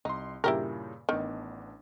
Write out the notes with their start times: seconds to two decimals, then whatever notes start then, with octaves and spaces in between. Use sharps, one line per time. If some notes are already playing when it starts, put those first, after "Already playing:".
0.05 C2 D#4 C6
0.44 G2 A#2 C#3 E4 G4 A#4
1.09 A1 D#3 B3 D4